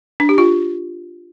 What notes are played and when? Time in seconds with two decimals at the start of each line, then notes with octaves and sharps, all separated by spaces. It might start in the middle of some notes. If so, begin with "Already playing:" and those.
0.20 D4
0.29 G4
0.38 F4